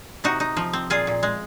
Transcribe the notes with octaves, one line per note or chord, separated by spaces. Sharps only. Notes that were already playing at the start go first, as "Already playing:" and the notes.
C3 D#4 F#4
D#4
F3
C4
A#2 F4 G#4
A#2
G#3